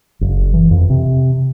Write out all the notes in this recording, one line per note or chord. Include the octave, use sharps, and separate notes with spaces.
F#1
E3
F2
C3